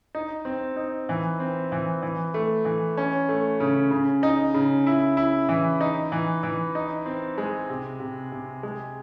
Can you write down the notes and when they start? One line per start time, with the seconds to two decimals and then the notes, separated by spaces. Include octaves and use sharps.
0.15 D#4
0.45 C4
0.77 D#4
1.09 E3
1.40 C4
1.72 E3
2.02 E3
2.34 A3
2.65 E3
2.97 C#4
3.29 A3
3.60 C#3
3.91 C#3
4.23 D#4
4.54 C#3
4.87 E4
5.17 E4
5.49 E3
5.81 D#4
6.12 E3
6.43 E3
6.75 D#4
7.06 C4
7.38 G#3
7.69 C3
8.00 C3
8.32 C3
8.63 G#3